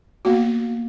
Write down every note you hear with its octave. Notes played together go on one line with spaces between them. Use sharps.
A#3 B3 F#4